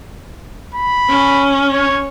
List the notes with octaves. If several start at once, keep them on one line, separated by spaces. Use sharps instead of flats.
B5
C#4
C#5